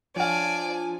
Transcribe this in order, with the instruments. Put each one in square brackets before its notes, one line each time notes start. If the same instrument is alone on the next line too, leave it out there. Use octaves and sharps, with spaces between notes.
[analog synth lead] F3 [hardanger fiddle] D4 D5 [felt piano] C#5 F5 [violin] G#5